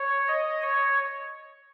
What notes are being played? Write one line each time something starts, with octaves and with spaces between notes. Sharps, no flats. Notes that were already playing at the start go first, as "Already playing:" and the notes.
Already playing: C#5
D#5
C#5